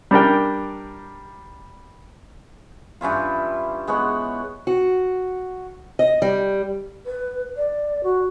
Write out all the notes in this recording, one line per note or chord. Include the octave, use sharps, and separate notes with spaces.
G3 D4 A#4 G5
G2 C#4 E4 F4
G#3 B3 C#5 F#5
F#4
D#5
G3
B4
D5
F#4